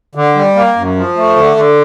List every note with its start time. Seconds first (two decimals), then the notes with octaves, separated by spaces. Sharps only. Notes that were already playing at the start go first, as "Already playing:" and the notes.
0.15 D3
0.35 G3
0.56 A#3
0.76 F#2
0.96 F3
1.16 A3
1.36 D3
1.56 D3